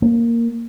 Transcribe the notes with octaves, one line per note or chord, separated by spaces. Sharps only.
A#3